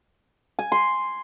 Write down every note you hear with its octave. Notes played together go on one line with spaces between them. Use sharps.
G#5
C6